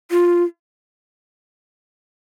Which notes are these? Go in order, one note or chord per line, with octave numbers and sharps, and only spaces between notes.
F4